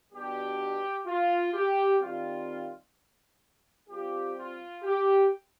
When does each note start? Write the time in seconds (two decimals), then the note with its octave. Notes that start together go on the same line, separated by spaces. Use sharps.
0.13 B2 G3 B3 D4 G4
1.07 F4
1.54 G4
2.01 D#3 G3 C4 F4
3.89 G3 C4 F4 G4
4.37 F4
4.84 G4